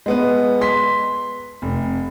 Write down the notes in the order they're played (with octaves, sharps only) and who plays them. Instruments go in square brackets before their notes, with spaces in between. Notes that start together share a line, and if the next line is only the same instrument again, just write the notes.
[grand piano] G#3 B3 B4
C6 B6
F1